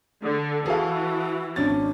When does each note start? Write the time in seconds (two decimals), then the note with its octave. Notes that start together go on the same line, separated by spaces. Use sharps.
0.23 D3
0.66 E3 F#4 G#4 A4 F5
1.56 G#1 C#4 D4 A6